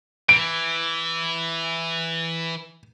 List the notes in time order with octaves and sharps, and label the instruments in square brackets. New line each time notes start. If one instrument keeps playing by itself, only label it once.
[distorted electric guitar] E3 [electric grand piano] D7